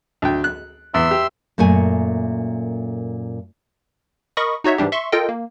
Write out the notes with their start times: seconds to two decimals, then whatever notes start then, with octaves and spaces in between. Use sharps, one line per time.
0.22 D2 G5
0.44 F#6
0.94 E2 E5 C6 E6
1.11 G4
1.58 F#2 A#2 A3 G#5
4.37 A#4 D#5 B5 C#6 D#6
4.64 D#4 F#4 C#5 E5
4.78 G#2 E3 G3 D4 G4
4.92 E5 C6 C#6
5.12 F4 A4 A#4 D#5 G5
5.29 A#3